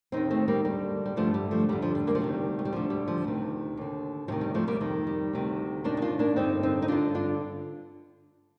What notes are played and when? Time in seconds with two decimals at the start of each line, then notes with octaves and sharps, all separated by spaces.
0.12 D#2 D#3 C4 D#4
0.30 A3 C4
0.48 G3 A#3
0.65 D2 D3 G3
1.06 G3
1.16 G2 D3 F3 A3
1.34 G3
1.51 F3 A3
1.69 F2 D3 G3
1.82 F3
1.95 G3
2.07 G3 A#3
2.15 F3
2.20 D2 C3 D#3 G3
2.59 A3
2.65 G3
2.72 D2 D3 F3
2.90 G3
3.08 F3
3.24 D2 C3 D#3
3.77 D#2 D3
4.28 D2 C3 D#3 F3
4.41 G3
4.54 F3 A3
4.68 G3 A#3
4.80 F2 D#3
5.07 G3
5.33 D2 C3 D#3
5.84 D#2 D#3 A#3 D4
5.97 D#4
6.02 D4 F4
6.19 A#3 D4
6.36 G2 D3 C4 D#4
6.63 C4 D#4
6.82 D#4
6.88 G2 D3 D4 F4
7.15 D4 F4